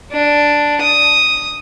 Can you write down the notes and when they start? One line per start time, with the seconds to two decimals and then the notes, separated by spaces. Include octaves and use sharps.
0.12 D4
0.81 D#6